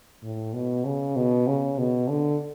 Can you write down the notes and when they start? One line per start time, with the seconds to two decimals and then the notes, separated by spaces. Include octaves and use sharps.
0.22 A2
0.54 B2
0.85 C#3
1.16 B2
1.47 C#3
1.78 B2
2.09 D3